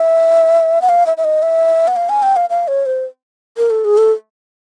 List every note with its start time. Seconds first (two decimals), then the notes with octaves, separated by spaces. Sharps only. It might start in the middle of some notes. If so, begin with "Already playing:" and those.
Already playing: E5
0.82 F#5
0.89 F5
1.06 E5
1.17 E5
1.24 D#5
1.42 E5
1.88 F#5
1.96 F5
2.09 G#5
2.23 G5
2.36 F5
2.50 F5
2.68 C#5
2.86 C5
3.57 A#4
3.70 A4
3.85 G#4
3.98 A4